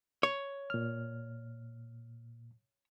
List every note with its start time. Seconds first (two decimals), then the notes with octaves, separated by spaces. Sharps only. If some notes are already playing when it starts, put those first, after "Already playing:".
0.23 C#5
0.70 A#2 F6